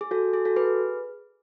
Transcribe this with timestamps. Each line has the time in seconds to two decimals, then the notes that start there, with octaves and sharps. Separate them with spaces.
0.01 G#4
0.11 F#4 A4
0.33 G#4
0.45 F#4 A4
0.56 G#4 B4